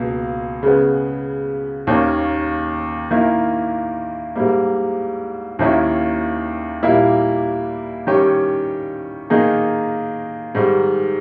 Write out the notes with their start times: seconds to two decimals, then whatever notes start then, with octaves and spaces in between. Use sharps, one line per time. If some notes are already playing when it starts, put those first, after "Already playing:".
Already playing: C#2 B2 A#3
0.63 C#3 G#3 B3
1.87 D#2 D#3 A#3 C#4
3.10 D#3 A#3 E4
4.36 G#2 G3 A#3
5.59 D#2 D#3 A#3 C#4 E4
6.83 A#2 G3 A#3 E4
8.07 D#3 G3 C#4 G4 C#5
9.30 D#3 A#3 D#4 G#4
10.55 G#2 D#3 G3